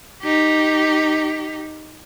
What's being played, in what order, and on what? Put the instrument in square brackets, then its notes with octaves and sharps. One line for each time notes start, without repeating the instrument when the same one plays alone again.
[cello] D#4 G4